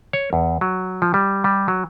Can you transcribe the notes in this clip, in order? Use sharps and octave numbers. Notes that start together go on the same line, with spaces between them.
C#5
E2
F#3
F3
G3
G3
F#3